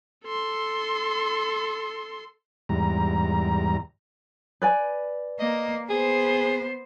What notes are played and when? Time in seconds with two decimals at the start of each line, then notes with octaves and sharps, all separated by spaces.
0.24 A4 C6
2.69 E2 G#2 G3 A#5
4.62 B4 D5 G#5
5.39 A#3 D#5
5.90 B3 G#4 C5